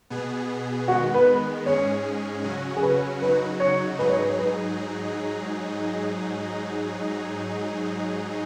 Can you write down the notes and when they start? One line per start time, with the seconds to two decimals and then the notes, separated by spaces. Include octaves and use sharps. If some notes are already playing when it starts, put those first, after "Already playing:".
0.10 B2 B3 G#4
0.88 D#3 G#3 B3 F#4
1.14 B4
1.66 G#2 G#3 C#4 G#4 C#5
2.44 C#3 F#3 C#4 F#4
2.77 G#4
2.82 B4
3.21 C#3 F#3 D#4 F#4 B4
3.60 C#5
3.99 G#2 F#3 D#4 G#4 B4
4.09 C#5
4.19 B4
4.29 C#5
4.39 B4